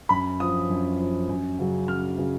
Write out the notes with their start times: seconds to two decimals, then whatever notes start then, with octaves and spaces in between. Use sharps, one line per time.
0.09 F#2 B5
0.40 F3 D#6
0.70 F#2
1.00 F3
1.29 F#2
1.59 C#3 F#3
1.88 F#2 F6
2.18 C#3 F#3